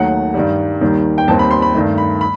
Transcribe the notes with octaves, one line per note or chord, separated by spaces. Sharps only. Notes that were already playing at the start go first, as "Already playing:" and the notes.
Already playing: D#2 D#3 F#3 A3 F#5
G2 D#3 G3
D#2 D#3 G3
G5
D#2 D#3 G3 C4 A5
B5
C6
B5
G2 D#3 A3
B5
B5